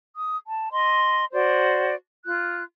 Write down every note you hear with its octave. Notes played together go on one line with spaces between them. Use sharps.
D#6
A5
D#5 C6
F#4 C5 D5
F4 F#6